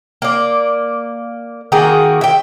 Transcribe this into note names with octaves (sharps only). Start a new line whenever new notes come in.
A#3 D5
D#3 A#3 F#4 G#4
E5 G5